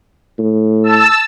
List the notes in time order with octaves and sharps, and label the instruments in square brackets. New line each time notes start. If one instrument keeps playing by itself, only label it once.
[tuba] A2
[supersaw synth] A5 E6